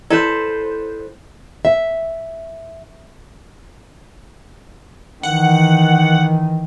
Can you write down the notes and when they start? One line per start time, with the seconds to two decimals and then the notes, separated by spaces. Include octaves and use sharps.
0.10 E4 A4 B4 C5 D5
1.65 E5
5.23 D#3 E3 F#5